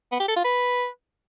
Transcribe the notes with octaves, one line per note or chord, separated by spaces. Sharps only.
B3
G4
A4
F4
B4